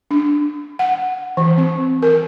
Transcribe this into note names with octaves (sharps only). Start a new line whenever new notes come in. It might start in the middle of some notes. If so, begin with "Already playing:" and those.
D4
F#5
E3
C4
A#4